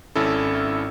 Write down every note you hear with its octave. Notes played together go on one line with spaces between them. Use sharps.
G#1 C#4 E4 A4